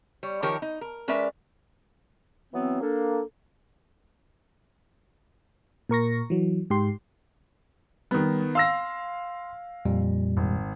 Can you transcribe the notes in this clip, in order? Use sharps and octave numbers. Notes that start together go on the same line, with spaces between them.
G3 C#5
D#3 F3 G4 A#4 C#5
D#4
A#4
G#3 C#4 A#4 B4 D5 E5
E3 F#3 B3 C4
A#3 D4 A4
A#2 A#4 C#6 A#6
E3 F#3
G#2 G4 C6
D#3 G3 B3
F5 C6 E6 A#6
F2 A#2 G3
G#1